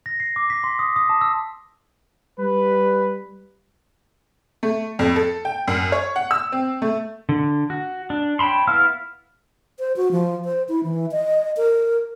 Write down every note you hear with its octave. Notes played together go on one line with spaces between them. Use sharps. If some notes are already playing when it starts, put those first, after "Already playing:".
A#6
C7
D6
B6
C6
D#6
D#6
A5
E6
G3 B4
A3
F2
A4
G5
F#2
C#5
F#5
E6
C4
A3
D3
F#4
D4
C#5 G5 A5 B5 C6
B3 E4 F5 E6 F6
C5
F#4
F3
C5
E4
E3
D#5
A#4